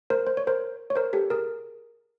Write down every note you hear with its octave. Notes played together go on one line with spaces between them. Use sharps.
A#4 C5
C5
C#5
A#4 C5
C#5
A#4 C5
G4 A4
G#4 A#4